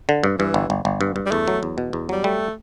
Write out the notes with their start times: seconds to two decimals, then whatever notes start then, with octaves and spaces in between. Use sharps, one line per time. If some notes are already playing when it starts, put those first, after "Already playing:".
0.09 D3
0.24 G2
0.39 G2 E3
0.54 G1
0.70 G1
0.85 G1
1.01 G2
1.16 G2
1.26 G3
1.31 E2 A3
1.48 F#3
1.63 E2
1.78 B2
1.93 E2
2.09 F#3 G3
2.24 G3 A3